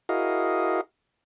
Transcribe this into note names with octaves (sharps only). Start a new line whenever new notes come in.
E4 F#4 G#4 A#4 D#5 F5